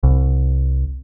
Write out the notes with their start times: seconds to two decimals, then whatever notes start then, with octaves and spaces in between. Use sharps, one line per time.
0.03 C2